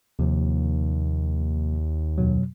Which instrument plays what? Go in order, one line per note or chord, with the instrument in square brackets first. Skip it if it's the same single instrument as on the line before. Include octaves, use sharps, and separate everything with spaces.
[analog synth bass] D#2 [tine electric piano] C3 F3 A#3
[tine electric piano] F2 B2 F#3